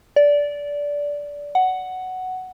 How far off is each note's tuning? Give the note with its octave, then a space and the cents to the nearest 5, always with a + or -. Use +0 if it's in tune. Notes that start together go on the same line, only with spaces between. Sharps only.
D5 -15
F#5 +5